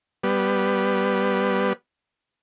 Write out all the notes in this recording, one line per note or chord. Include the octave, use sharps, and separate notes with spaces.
G3 B3